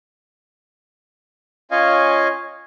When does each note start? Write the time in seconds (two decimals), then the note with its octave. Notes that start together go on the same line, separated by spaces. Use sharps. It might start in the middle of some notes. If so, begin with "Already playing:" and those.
1.71 C#4 F4 C#5 D#5 F5 G#5